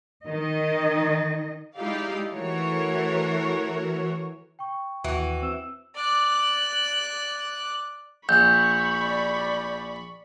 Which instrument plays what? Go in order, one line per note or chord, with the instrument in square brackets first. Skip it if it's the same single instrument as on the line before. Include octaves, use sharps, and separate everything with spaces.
[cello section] D#3 D#5
[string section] G#3 D#4 E4 G4 D5 F5
E3 A3 F#4 A#4 C#5
[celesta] G5 C#6
[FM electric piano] D#2 [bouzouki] E3 F#4
[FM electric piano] C4 [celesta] E6 E7
[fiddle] D5 F#6
[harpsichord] A#1 [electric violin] B5 C#6 [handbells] G6
[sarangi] D5